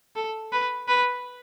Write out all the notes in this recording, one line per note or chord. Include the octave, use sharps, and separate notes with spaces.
A4
B4
B4